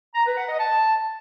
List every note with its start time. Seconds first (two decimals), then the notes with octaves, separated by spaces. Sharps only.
0.14 A#5
0.25 B4
0.37 F#5
0.48 D#5
0.59 A5